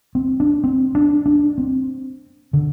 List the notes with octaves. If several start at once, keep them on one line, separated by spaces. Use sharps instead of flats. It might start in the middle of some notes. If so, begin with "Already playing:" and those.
C4
D4
C4
D4
D4
C4
D3